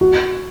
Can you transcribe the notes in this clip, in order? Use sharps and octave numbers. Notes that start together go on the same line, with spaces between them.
F#4